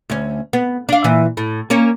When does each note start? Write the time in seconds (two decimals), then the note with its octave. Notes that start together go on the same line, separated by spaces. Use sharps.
0.10 D2 C#4
0.53 B3
0.89 D4 F5
1.04 A#2 E3
1.37 A2
1.70 A#3 C#4 C#5